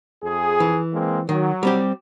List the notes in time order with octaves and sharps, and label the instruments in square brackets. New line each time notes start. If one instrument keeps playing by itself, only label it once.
[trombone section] F2 G#4
[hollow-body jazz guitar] E3
[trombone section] G#3 A#3 C4
[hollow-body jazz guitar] D#3 [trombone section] F#3
[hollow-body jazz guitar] G3 C4 G4